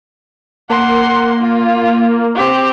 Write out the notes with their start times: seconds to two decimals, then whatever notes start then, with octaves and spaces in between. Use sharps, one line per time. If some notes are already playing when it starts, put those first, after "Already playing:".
0.70 A#3 F#5 C6
1.41 F4
2.35 C4 G4